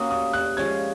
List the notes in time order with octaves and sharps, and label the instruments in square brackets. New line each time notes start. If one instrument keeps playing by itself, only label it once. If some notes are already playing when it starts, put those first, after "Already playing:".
Already playing: [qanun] A#3 C#4 F#4 [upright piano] D#6
[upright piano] D#6
F#6
[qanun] F3 G#3 C#4 [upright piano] G#6